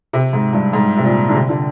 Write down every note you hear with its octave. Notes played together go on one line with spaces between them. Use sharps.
C3
G#2
G2
G#2
C3
A#2
D3
C3
D3